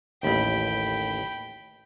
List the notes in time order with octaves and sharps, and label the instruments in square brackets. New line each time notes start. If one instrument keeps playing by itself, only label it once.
[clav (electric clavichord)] A1 D#2 [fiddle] G5 B5